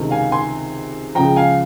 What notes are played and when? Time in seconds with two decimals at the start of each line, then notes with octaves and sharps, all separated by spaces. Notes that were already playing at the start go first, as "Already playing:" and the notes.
Already playing: C#2 C3 D#3
0.11 F5 G#5
0.32 G#5 C6
1.15 C#2 C#3 F3 G5 A#5
1.36 F5 G#5